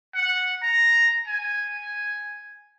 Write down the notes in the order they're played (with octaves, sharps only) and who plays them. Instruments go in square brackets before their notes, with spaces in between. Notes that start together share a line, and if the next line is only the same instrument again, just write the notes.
[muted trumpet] F#5
A#5
G#5